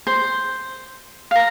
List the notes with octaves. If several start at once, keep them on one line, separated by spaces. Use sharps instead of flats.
C5
F5 A#5